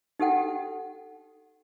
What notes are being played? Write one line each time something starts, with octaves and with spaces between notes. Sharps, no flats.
D#4 G4 A4 F#5 G5